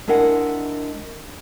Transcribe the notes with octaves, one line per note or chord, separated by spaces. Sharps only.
G#3 D4 E4 A#4 D#5 F#5